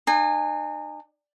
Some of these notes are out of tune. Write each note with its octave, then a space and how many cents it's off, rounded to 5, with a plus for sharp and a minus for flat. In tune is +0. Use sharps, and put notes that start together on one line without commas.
D#4 -45 G#5 -15